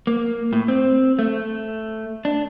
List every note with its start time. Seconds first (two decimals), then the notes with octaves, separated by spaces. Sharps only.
0.07 A#3
0.53 A2
0.68 C4
1.19 A3
2.25 D4